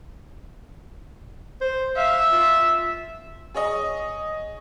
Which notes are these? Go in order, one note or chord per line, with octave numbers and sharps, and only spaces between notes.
C5
E5 F5
F4
G#4 C#5 D#5